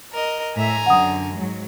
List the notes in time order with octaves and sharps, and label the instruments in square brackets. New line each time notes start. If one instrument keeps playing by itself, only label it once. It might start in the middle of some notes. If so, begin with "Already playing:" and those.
[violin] A#4 D#5
[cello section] A2 E5 [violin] G#5 A#5
[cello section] F#2 D3 [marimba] F#5 D#6
[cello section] G#2 F#3 G#3